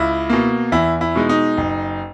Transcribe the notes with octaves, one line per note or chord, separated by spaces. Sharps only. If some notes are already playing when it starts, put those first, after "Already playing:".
Already playing: C#2 E4
B2 A#3
E2 E4
E4
B2 G#3 D#4
D#4
F#1